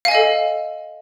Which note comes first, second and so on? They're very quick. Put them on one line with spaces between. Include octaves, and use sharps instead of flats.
F5 G#5 D#5 A4